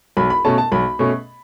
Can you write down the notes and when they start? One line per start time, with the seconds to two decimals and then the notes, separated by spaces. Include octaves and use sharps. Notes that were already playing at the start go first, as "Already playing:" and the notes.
0.17 B1 B5
0.30 B5
0.45 B2 A3 C#4 A5
0.58 A5
0.72 B1 B5
0.99 B2 A3 C#4